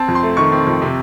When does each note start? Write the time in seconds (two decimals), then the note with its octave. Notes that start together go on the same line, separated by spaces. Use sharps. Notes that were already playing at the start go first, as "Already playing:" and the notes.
Already playing: C4 A5
0.08 F2
0.15 C6
0.23 A3
0.37 D#3 C#6
0.52 C4
0.67 F2
0.82 C3